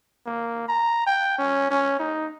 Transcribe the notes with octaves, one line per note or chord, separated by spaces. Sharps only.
A#3
A#5
G5
C#4
C#4
D#4